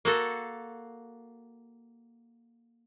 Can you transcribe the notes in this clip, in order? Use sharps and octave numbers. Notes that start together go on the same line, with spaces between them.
A#3 F#4 A4